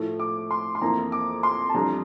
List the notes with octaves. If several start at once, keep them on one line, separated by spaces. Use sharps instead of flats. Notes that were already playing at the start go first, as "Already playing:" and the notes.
Already playing: A2 F3 A3
D6
C6
C6
F2 E3 A#3 E4 A#5
D6
C6
A5
F2 E3 G3 D4 A#5